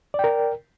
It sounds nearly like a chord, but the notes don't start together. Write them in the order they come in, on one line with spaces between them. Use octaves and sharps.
D5 G5 A#4